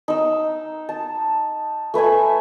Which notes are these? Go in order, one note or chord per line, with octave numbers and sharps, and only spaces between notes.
D#4 E6
A5
A3 B4 E5 G#5